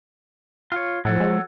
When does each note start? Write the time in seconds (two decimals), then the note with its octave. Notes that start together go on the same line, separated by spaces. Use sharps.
0.72 F4 C#5
1.05 A2 F3 F#3 A4
1.20 G#3